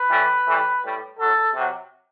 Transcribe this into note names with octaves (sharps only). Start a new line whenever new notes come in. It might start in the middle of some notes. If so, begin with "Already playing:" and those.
Already playing: B4
A2 E3 G3
A2 E3 G3
A2 G3
A2 F#3 A4
C3 F#3